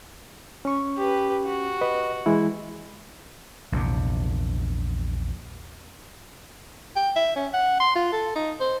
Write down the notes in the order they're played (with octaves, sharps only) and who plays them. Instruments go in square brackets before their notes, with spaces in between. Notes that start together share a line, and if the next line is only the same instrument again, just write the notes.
[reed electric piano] C#4 C#6
[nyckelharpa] G4 B4
F#4
[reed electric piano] B4 D#5
E3 G#3 E4
[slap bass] A#1 E2 C3
[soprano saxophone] G5
E5
C#4
F#5
C6
F4
A4
D#4
C5